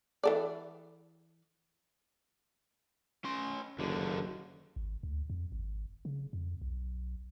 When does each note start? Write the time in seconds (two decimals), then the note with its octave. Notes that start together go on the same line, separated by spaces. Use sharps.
0.23 E3 A4 D5
3.24 C#4 C6
3.78 F#1 D#2 D3
4.76 G#1
5.03 D2
5.30 F2
5.52 G#1
6.05 C#3
6.33 F2
6.62 B1